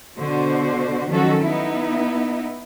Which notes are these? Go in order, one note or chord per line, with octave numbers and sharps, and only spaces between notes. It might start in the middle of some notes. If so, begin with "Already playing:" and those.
B2 D3 F#4 C5
D#3 F3 F#3 C#4 F#4 A4
B3 D#4 E4